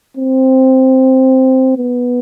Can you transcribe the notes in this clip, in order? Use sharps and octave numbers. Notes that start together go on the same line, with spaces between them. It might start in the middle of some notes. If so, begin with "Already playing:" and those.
C4
B3